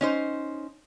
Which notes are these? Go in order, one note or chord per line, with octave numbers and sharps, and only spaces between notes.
C#4 D#4 C5